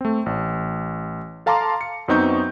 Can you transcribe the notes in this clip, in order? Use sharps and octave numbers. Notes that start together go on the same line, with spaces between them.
A3 C4
A1
A4 F5 A5 A#5 C6 D6
C#7
F#2 B3 C4 D#4 C#6 G6